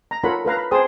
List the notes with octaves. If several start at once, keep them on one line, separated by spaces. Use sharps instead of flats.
A#5
F4 A4 A#4 C#5 F#5 B5
A4 B4 F5 A#5
B5
G#4 C5 G5 A5 D#6